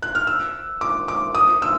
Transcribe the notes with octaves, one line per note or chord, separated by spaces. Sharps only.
F#6
F6
E6
D6
D6
D#6
E6